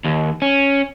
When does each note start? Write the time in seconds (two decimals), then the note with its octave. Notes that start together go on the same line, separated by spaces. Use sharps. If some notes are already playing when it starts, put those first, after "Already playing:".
0.05 D#2
0.42 C#4